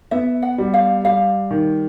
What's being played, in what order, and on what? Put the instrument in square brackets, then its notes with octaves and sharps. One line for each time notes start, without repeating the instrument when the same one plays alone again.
[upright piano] B3 [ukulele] E5
[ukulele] F#5
[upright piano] G3
[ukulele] F5
[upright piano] G3 [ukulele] F5
[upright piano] D#3